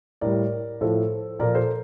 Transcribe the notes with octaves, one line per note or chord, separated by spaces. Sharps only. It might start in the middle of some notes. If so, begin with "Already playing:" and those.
A2 G3 A#4 D5
A2 F3 A4 C5
A#2 F3 A#4 D5
A4 C5